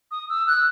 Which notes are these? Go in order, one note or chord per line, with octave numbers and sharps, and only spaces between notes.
D#6
E6
F#6